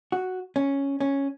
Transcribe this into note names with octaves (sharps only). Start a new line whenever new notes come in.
F#4
C#4
C#4